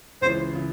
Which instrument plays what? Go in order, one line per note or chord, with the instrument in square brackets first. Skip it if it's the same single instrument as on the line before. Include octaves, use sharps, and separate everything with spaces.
[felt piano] C#2 C#3 E3 [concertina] C5
[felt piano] C#3 E3